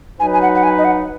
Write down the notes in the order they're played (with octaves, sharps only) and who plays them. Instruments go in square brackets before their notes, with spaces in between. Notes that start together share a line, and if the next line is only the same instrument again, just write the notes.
[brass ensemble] F#3 D#4 B4 [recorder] G#5
[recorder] G#5
F#5
F#5
G#5
D#5
F#5